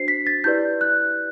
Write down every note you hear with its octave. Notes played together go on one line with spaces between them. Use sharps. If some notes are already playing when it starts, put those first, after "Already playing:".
Already playing: D4 F#4 C5 C7
B6
A6
E4 G4 B4 D5 G6
F#6